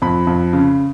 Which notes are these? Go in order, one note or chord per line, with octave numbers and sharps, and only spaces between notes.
F2 B5
F2
C#3